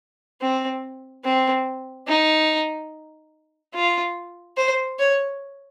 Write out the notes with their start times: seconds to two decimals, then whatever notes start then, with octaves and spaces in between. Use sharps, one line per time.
0.41 C4
1.25 C4
2.07 D#4
3.74 F4
4.57 C5
4.99 C#5